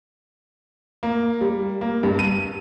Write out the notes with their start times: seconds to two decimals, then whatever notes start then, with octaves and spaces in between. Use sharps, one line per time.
1.03 A#3
1.41 G3
1.81 A#3
2.03 G2
2.19 D#7